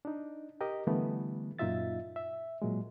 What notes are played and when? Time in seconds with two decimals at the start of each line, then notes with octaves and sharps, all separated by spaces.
0.05 D4 D#4
0.61 G4 A#4 D#5
0.87 D3 E3 G3 A3 B3
1.59 F#2 A#2 D#4 F4 E5 A6
2.16 E5
2.62 A#2 F#3 G#3